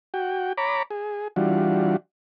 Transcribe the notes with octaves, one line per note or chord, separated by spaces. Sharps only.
F#4 G5
C#5 A#5 B5 D6
G#4
E3 G3 D4 F4 F#4